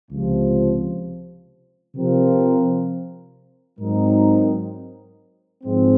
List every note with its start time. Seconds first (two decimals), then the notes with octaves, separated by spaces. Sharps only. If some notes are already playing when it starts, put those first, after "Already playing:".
0.10 C#2 C3 F3
1.95 C3 F3 C4 F4 A#4
3.79 G#2 F#3 C4 D#4 A#4
5.64 G#2 F3 G#3 C4